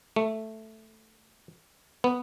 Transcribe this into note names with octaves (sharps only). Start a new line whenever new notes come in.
A3
B3